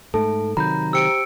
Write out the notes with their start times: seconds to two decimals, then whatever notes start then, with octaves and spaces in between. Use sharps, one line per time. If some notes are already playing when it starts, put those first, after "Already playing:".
0.14 G#2 A3 A4 A5
0.57 C3 D#3 F#3 A#5 B5 G6
0.93 G4 C5 G5 E6 C#7 D7